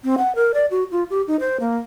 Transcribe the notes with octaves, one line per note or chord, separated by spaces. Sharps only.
C4
F#5
A#4
D5
F#4
F4
G4
D#4
C5
A#3